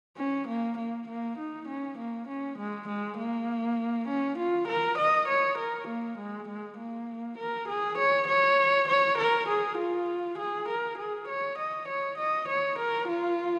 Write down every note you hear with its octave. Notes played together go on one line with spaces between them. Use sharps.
C#4
A#3
A#3
A#3
D#4
C#4
A#3
C#4
G#3
G#3
A#3
C#4
F4
A#4
D#5
C#5
A#4
A#3
G#3
G#3
A#3
A#4
G#4
C#5
C#5
C#5
A#4
G#4
F4
G#4
A#4
G#4
C#5
D#5
C#5
D#5
C#5
A#4
F4